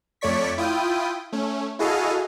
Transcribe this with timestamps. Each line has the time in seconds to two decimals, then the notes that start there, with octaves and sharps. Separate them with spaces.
0.21 F2 A3 C#5 D5 C#6 B6
0.58 E4 F4 G5 D#6
1.33 A3 C#4
1.79 E4 F#4 G#4 A4 D#5 F5